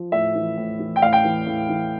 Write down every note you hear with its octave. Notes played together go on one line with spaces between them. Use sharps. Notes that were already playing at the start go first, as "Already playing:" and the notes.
Already playing: F3
A2 E5
E3
A2
E3
G5
A2 F5
G5
E3
A2
E3